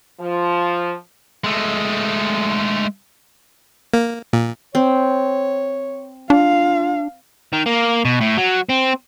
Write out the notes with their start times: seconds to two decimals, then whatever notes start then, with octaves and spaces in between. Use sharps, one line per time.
0.20 F3
1.44 G#3 A3
3.94 A#3
4.33 A#2
4.75 C4 C#5
6.30 D4 F4 F5
7.53 D#3
7.66 A#3
8.05 B2
8.21 A2
8.37 F#3
8.69 C4